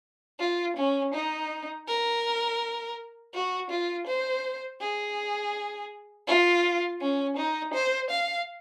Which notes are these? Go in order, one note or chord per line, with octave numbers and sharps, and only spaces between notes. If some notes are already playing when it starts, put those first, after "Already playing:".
F4
C#4
D#4
A#4
F#4
F4
C5
G#4
F4
C#4
D#4
C5
F5